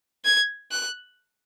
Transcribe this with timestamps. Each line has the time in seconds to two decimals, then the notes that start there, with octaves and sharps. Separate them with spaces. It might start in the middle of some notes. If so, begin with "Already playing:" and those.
0.25 G#6
0.71 F#6